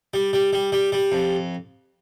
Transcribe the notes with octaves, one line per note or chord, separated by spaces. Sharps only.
G3
G3
G3
G3
G3
F2